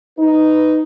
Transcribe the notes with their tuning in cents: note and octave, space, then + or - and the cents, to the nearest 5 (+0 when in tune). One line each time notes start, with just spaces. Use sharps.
D#4 +0 B4 +15